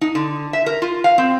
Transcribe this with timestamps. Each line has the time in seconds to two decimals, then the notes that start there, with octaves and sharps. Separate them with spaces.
0.01 D#4
0.15 D3
0.53 E5
0.66 A#4
0.82 F4
1.04 F5
1.18 C4